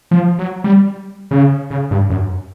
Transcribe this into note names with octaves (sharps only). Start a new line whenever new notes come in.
F3
F#3
G3
C#3
C#3
G2
F#2